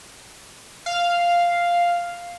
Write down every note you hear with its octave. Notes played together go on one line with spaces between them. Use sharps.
F5